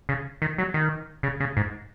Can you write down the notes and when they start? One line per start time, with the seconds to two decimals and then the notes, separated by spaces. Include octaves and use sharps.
0.09 C#3
0.42 D#3
0.58 F#3
0.74 D#3
1.23 C#3
1.40 C#3
1.57 G#2